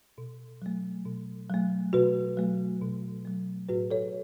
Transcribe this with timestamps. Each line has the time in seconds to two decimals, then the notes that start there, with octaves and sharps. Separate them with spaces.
0.18 B2
0.62 F#3 A3
1.05 B2
1.49 F#3 A3
1.93 B2 F#4 B4
2.37 F#3 A3
2.82 B2
3.25 F#3 A3
3.69 A2 F#4 B4
3.91 A4 C#5